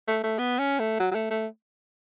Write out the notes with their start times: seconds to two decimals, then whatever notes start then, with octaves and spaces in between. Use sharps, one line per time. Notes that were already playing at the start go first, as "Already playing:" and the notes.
0.08 A3
0.24 A3
0.39 B3
0.59 C#4
0.79 A3
1.00 F#3
1.11 F#3
1.15 A3
1.31 A3